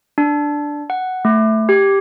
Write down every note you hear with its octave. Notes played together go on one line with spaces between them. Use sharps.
D4
F#5
A3
G4